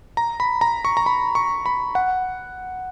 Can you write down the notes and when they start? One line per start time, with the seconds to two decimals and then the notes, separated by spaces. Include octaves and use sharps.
0.17 A#5
0.40 B5
0.61 A#5
0.85 C#6
0.97 A#5
1.06 B5
1.35 C#6
1.66 B5
1.95 F#5